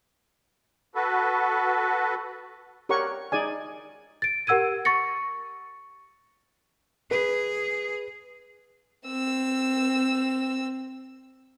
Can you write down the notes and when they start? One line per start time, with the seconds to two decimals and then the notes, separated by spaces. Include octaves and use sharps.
0.95 F#4 A4 B4
2.89 G4 A#4 C#5 F#5 C#6
3.32 D#4 G#4 D5 G#5
4.22 A6 D7
4.47 G4 A#4 F#5 E6 G#6 D#7
4.85 C#6 A6 A#6 C#7
7.11 G#4 B4
9.07 C4 E6